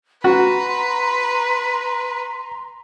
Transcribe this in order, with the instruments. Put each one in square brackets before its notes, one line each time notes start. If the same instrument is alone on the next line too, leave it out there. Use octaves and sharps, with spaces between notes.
[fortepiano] F#4 [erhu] B4 [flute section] A#5 C6